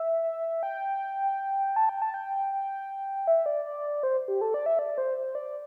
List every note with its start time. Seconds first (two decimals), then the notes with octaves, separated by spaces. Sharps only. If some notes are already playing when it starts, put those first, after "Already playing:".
Already playing: E5
0.63 G5
1.76 A5
1.89 G5
2.02 A5
2.14 G5
2.53 G5
3.27 E5
3.46 D5
3.66 D5
4.03 C5
4.28 G4
4.41 A4
4.54 D5
4.66 E5
4.79 D5
4.98 C5
5.17 C5
5.35 D5